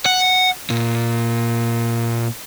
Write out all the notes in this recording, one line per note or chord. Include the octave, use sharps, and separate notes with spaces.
F#5
A#2